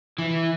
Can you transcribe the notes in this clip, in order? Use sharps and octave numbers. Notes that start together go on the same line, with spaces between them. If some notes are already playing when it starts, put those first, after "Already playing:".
E3